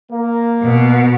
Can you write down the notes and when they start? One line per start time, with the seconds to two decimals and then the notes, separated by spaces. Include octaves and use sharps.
0.11 A#3
0.64 B2